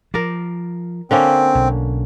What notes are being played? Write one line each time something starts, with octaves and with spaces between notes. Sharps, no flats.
F3 A#4 D5
D3 A#3 C4 C#4
B1